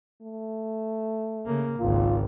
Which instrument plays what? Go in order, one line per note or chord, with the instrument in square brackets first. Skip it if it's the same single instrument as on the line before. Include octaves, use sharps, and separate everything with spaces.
[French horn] A3
[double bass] C#3 A#3
[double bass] G#1 C#2 [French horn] F4